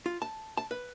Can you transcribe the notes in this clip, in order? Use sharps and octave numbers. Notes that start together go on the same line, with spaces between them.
F4
A5
A5
B4